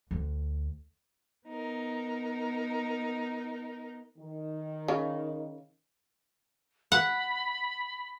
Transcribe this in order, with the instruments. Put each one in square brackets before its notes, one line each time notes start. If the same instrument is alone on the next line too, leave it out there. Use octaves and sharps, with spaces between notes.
[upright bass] D2
[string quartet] B3 D#4 A#4
[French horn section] D#3
[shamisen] C#3
[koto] F#5 [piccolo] B5